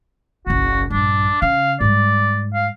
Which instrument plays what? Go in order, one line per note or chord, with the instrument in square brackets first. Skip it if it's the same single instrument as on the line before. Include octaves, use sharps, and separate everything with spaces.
[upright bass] F#1 B1 [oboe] F#4
[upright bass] A#1 G2 [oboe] D4
[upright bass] C#3 [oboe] F5
[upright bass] G#2 G3 [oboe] D5
[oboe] F5